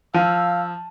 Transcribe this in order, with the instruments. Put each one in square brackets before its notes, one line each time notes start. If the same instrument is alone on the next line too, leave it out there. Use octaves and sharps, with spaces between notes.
[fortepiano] F3 [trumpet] F5 [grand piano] A5 D#7 [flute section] E6